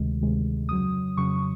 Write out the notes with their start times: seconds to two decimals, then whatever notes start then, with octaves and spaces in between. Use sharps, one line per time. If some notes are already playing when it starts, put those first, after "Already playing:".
Already playing: D2 C3 D#3 G#3
0.21 D2 C3 D#3 G#3
0.69 F2 C#3 F#3 D#6
1.17 F2 C#3 F#3 C#6